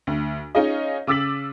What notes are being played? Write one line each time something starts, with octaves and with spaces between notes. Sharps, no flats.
D2
C#4 D#4 F4 G#4 D#5
C#3 D6 E6 A6 B6 F#7